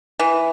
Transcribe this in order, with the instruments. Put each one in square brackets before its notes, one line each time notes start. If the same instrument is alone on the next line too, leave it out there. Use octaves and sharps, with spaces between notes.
[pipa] E3